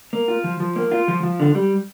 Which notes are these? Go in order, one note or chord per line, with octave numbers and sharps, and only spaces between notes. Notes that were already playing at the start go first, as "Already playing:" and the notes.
A#3
F4
F3
F3
A#3
F4
F3
F3
D3
G3